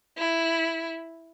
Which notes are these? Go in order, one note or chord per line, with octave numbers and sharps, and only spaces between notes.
E4